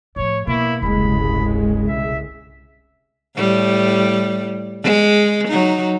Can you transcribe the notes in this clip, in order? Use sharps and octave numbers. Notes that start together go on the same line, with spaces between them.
A2 F3 C#5
B2 A#3 E4
E1 C2 G2 C#3 G#3 B5
B2 E5
A2 G3
G#3
F#3 D#4